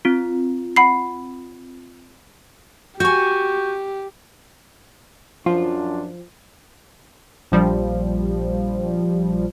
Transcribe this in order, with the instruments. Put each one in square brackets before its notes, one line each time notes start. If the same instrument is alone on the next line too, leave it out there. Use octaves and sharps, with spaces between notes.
[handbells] C4 F4
[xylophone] F#5 B5 C7
[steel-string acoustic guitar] F#4 G#5 [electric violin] G4 [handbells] C#6 G6
[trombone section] F#2 D4 [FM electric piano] F3 [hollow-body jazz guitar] F4
[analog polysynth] A#1 F3 G3